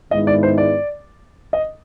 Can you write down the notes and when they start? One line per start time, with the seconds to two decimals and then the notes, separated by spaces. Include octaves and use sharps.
0.11 G#2 D#3 G#3 B3 E4 D#5
0.27 D5
0.43 C5
0.58 D5
1.53 D#5